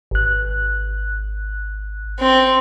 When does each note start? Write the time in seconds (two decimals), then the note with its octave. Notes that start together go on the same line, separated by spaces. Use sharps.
0.11 G#1 F#6
2.20 C4